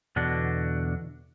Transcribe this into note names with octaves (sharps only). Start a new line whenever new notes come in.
E2 B2 D3 D4 F#4